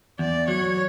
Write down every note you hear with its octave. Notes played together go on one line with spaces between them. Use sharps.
E2 D5
F#3 C#5